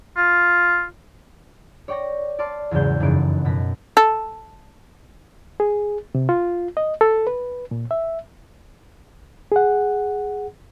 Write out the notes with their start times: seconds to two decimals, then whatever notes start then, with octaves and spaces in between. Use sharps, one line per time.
0.17 F4
1.88 C#5 D5 G5 C#6 A#6
2.39 D5 A5 C6 D6 F6
2.71 E2 G#2 C#3 F#3 G#3 G6
3.00 F1 F#2 C#3 E3 D#4 D7
3.45 F#2 B2 A#6 B6
3.97 A4
5.60 G#4
6.15 C3
6.29 F4
6.77 D#5
7.01 A4
7.27 B4
7.71 A#2
7.91 E5
9.52 G#4 F#5